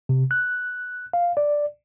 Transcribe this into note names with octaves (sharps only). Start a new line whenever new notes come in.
C3
F#6
F5
D5